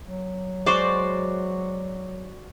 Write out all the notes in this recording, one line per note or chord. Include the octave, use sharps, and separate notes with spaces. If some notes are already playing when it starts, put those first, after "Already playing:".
F#3
G#3 F#4 C5 D5